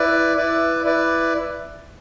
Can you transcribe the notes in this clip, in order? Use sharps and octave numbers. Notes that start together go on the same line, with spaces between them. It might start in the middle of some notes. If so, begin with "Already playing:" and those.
Already playing: E4 B4 D5
E4 B4 D5
E4 B4 D5